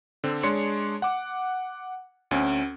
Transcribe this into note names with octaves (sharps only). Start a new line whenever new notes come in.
D3 C4
G#3 D4 C#5 C6 C#7
F#5 D6
D2 C4 C#4